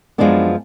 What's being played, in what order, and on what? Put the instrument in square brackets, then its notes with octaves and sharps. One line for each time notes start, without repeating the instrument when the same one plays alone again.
[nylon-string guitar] F#2 F3 G#3 B3 D4